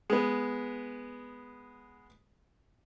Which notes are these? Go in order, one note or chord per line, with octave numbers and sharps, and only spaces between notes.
G#3 B3